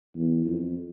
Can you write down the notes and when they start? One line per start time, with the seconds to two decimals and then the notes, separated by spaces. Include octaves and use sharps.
0.16 E2
0.46 F2